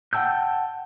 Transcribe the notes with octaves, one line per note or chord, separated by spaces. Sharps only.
F#5 G5 A5 E6 G6